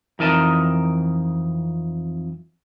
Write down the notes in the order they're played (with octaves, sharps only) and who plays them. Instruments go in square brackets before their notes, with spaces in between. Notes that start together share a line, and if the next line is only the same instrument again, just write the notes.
[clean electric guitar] F2 E3 D#4 A#4 D#5 A5